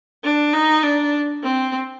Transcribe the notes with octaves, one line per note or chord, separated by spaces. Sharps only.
D4
D#4
D4
C4